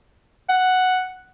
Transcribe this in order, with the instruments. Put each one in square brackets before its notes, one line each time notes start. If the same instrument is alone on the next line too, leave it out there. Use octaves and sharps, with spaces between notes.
[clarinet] F#5